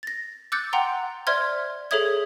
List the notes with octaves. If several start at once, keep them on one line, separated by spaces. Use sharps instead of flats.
A6 A#6
D6 E6 F#6 G6 A6 C#7
F#5 G5 A#5 C6
C5 D5 E5 C6 F6 G#6
G#4 A4 C#5 E5 D#6 G#6